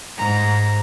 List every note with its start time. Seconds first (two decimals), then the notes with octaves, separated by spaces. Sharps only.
0.17 G#2 A#5